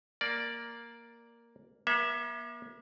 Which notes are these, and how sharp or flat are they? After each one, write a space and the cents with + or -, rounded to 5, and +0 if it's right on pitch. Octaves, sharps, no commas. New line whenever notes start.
A#3 +0 D5 +0
A#3 +40 E5 +0